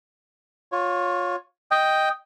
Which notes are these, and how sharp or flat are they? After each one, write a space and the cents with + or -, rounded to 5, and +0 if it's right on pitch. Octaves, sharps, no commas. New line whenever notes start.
F4 +25 C#5 +0
D#5 +5 G5 +0